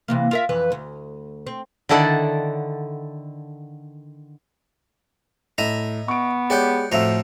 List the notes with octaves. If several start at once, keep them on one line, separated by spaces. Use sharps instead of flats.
C3 E3 A#3
F4 A#4 E5
F2 E3 B4
D2
C4
D3 D#3 E4 A4 D5 F#5
A2 D#5 E5 A#5
B3 C#6 D7
G#3 G4 C#5 D5 F#5 G5
F2 A2 F3 F#4 E5 A#5 E6